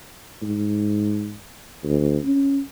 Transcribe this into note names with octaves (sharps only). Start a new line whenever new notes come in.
G#2
D2
C#4